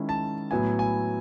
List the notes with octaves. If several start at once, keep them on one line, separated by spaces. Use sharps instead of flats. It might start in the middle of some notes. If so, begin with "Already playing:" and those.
Already playing: D#3 G#3 C#4 E4
A5
A2 F#3 B3 E4 G#5
G#5